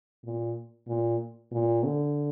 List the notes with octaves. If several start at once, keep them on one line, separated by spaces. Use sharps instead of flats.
A#2
A#2
A#2
D3